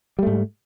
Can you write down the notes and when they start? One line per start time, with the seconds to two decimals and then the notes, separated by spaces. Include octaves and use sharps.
0.19 G3
0.23 A3
0.27 G#2